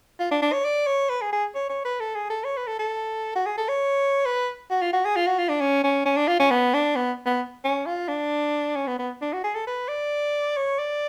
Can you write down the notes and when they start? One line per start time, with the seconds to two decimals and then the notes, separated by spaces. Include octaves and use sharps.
0.19 F4
0.31 D4
0.42 D4
0.53 C#5
0.65 D5
0.87 C#5
1.10 B4
1.21 G#4
1.32 G#4
1.55 C#5
1.69 C#5
1.85 B4
2.00 A4
2.15 G#4
2.30 A4
2.45 C#5
2.57 B4
2.67 A4
2.79 A4
3.36 F#4
3.46 G#4
3.58 A4
3.68 C#5
4.25 B4
4.70 F#4
4.82 F4
4.93 F#4
5.05 G#4
5.16 F4
5.27 F#4
5.39 F4
5.49 D4
5.61 C#4
5.84 C#4
6.05 C#4
6.17 D4
6.28 F4
6.40 C#4
6.50 B3
6.74 D4
6.96 B3
7.25 B3
7.64 C#4
7.86 F4
8.08 D4
8.76 C#4
8.87 B3
8.99 B3
9.21 D4
9.33 F#4
9.44 G#4
9.55 A4
9.67 B4
9.89 D5
10.57 C#5
10.79 D5